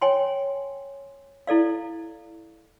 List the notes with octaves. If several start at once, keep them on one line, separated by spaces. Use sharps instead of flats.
C#5 G5 G#5 C6
E4 A4 D5 F5